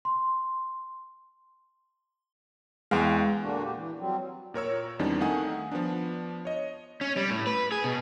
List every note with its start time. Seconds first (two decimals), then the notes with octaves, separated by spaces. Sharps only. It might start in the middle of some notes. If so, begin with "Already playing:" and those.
0.05 C6
2.91 E2 G#3 F5 G5 C6
3.42 A#2 D3 A#3 D4 F#4
3.63 G4
3.77 E3
3.99 F#3 G3 C4
4.54 A#2 A#4 C#5 E6
4.99 E2 D#3 G3 C4 D4
5.20 D#3 A3 F5 F#5 G#5 D#6
5.72 F3 B3 D4
6.45 C#5 D#5
7.01 C#4
7.17 G3
7.30 A2
7.47 B4
7.72 G#4
7.84 B2